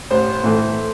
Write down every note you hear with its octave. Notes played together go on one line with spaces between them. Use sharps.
A1 C5
A2 E3 A3